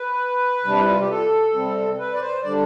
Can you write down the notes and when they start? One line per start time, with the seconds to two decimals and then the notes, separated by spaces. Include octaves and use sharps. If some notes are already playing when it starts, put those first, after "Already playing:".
Already playing: B4
0.64 C3 G3 D4
0.80 E4
0.90 F4
0.99 G4
1.09 A4
1.54 C3 G3 C4
1.98 B4
2.13 D5
2.20 C5
2.43 D3 G3 D4 D5